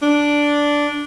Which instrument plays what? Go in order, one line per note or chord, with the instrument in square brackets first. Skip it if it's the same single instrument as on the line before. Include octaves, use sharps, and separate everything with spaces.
[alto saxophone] D4